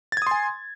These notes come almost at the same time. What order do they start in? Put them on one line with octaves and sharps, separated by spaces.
A6 G#6 D#6 C6 G#5